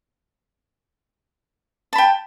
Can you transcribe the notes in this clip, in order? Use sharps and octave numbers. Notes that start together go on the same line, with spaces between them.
G5 A5 B5